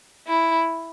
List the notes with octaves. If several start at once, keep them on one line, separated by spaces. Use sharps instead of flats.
E4